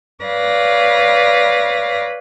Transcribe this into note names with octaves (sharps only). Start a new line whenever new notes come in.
B4 C#5 D5 F5 A#6